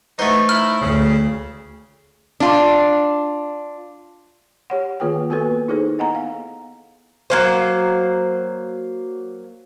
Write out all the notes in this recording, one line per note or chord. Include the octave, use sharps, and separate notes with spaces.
E3 A3 B3 D#4 C5
D#4 E4 F6
D2 C#3
D4 F4
G4 C#5 F#5
D#3 A#3 F4 G#4 B4 G5
A#3 B3 F#4 A4 B4
D#4 E4 G#4 A4 C5
B3 D#5 F#5 G#5 A#5
F5
F#3 A#3 C5